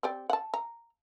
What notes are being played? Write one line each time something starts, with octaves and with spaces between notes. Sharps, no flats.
C4 G4 D5
F#5 A5
A#5